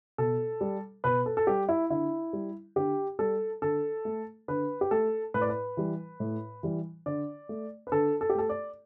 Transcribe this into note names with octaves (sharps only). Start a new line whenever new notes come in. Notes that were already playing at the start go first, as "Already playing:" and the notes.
B2 A4
G3
B2 B4
A4
A4
G3 G4
E4
D3 E4
G3
D3 G4
G3 A4
D3 A4
A3
D3 B4
G4
A3 A4
A2 B4
D5
B4
E3 G3
A2
E3 G3
D3 D5
A3
B4
D3 A4
A4
G4
A3 A4
D5